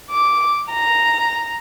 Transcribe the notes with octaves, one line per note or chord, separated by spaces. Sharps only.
D6
A#5